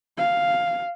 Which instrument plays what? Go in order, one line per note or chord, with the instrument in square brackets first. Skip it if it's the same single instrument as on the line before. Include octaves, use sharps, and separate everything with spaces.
[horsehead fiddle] F5